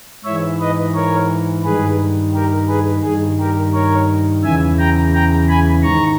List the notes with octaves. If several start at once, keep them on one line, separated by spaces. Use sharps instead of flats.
G#2 E3 C#5 E5
B4 D#5
A#4 C#5
G2 D#3 G#4 B4
G4 A#4
G#4 B4
G2 D#3 G#4
G4 A#4
A#4 C#5
E2 C#3 E3 E5 G#5
G5 A#5
G5 A#5
G#5 B5
G#2 D#3 A#5 C#6